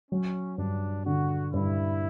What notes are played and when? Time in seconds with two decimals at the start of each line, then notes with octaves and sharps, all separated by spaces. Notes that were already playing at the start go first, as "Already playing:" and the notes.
0.11 F#3 C#4
0.58 G2 D4
1.06 D3 F#4
1.53 G2 E4